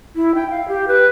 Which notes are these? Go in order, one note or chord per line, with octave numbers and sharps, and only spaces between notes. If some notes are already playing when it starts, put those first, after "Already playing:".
E4
G5
F5
G4
B4